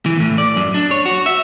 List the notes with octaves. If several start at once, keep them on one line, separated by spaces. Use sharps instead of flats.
E3
A2
D5
F#2
D4
C#5
F#4
E5